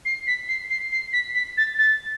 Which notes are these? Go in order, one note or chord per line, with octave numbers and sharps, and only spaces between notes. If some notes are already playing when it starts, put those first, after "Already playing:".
C7
B6
C7
C7
C7
B6
B6
A6
A6